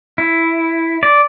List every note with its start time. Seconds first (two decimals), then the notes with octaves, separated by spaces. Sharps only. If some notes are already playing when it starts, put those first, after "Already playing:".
0.18 E4
1.03 D5